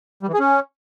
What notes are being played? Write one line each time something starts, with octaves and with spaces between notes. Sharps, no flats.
G3
E3
G#4
C#4